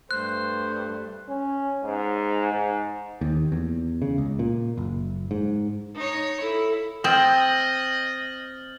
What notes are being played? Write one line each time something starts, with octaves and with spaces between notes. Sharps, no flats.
G2 A3 C5 F#6
C#4
G#2
G#2
D#2
E2
C#3
C#2
A#2
F#1
G#2
D#4 C#5
E4 A4
C4 D#5 G5 D#6 F6 G6 A6 F#7